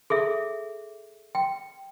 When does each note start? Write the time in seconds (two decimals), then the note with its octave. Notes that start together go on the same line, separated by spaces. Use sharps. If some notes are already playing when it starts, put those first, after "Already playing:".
0.10 G#4 A4 E5
1.35 G5